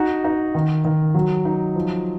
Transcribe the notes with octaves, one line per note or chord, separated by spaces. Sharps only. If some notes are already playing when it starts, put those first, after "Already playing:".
Already playing: D#4 F#4
D#4
D#3
D#3
F#3
D#4
F3